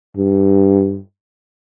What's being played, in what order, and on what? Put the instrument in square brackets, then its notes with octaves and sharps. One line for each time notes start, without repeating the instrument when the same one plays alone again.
[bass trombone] G2